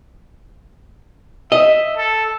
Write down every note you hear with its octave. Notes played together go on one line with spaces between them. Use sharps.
D#5 E5
A4